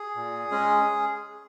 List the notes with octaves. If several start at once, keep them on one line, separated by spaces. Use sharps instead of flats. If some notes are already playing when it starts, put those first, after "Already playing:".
Already playing: G#4
A#2
G#3 C#4